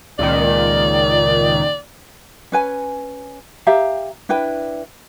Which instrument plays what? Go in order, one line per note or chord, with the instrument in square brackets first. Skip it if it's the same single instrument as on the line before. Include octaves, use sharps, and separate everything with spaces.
[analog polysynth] C#2 A#2 D#3 [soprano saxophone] D5
[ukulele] C#4 B4 G#5
G4 E5 F5 A#5
D4 E4 B4 G5